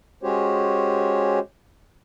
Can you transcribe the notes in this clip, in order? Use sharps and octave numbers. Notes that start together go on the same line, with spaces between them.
G#3 C#4 F#4 G4 C5 C#5